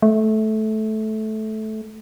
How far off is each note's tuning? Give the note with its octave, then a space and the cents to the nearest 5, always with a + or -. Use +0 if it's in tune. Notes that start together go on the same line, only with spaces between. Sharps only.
A3 -15